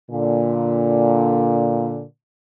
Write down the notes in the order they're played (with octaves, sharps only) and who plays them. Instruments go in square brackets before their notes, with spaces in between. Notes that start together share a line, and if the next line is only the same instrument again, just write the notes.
[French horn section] A#2 D3